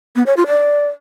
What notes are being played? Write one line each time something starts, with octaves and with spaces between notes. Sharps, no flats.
B3
C#5
F4
D5